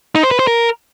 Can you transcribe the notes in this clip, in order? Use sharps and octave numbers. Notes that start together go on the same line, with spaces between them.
D#4
C5
B4
C5
A#4